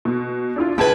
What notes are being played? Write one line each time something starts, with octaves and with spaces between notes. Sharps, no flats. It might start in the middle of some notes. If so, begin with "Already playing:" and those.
B2
D4 E4 F4
C#2 B4 G5 A5 G#6